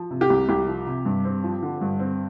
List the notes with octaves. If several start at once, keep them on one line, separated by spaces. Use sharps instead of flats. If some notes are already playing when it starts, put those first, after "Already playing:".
Already playing: F3
C3
G4
C2
C2 G4
F3
C3
G2
C4
F3
D3
G2
C4